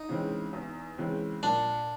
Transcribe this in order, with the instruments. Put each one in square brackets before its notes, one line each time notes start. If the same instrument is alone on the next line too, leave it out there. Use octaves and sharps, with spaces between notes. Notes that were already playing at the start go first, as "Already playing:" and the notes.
Already playing: [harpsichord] D#4
[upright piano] C#3 E3 G#3 C4
E2
C#3 E3 G#3 C4
[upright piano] A#2 [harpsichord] D4